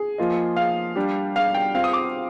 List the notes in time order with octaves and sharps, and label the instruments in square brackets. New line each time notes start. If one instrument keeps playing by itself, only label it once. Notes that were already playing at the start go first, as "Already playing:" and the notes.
Already playing: [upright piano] G#4
[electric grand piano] F3 A#3 F4 A#4 D#5
[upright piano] F5
[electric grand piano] G3 D4 G4
[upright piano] F5
G5
[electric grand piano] C4 F4 C5 [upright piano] F5
[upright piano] D#6
D6